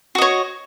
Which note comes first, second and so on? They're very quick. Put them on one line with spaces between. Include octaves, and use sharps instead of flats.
F#4 D#5 C#5